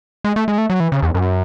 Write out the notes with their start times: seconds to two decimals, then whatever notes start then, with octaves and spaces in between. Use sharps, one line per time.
0.24 G#3
0.36 A3
0.48 G#3
0.58 A3
0.70 F#3
0.80 E3
0.92 C#3
1.02 E2
1.15 F#2